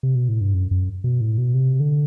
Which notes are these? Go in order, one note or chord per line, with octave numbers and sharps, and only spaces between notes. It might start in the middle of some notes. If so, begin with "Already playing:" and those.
C3
B2
A2
G2
F#2
F#2
B2
A2
B2
C3
D3